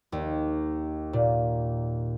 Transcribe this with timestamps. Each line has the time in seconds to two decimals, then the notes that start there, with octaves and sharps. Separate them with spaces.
0.12 D#2
1.13 A#2